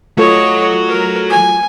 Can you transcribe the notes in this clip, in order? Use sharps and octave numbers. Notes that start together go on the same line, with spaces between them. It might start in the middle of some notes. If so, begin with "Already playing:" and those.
F#3 A3 F4 F#4 A4 C#5 D#5
A#4
G#5